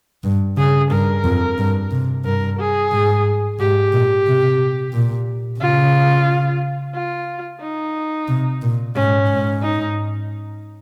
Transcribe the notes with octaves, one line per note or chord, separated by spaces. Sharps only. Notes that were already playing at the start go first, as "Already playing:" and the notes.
G2
C#3 G#4
G2 A#4
F2
G2
C3
G2 A#4
G#4
G#2
G#2 G4
A#2
C3
A#2
C#3 F4
F4
D#4
C3
A#2
G#2 C#4
G#2
D#4